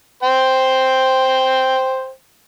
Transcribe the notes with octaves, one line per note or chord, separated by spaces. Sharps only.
C5 G5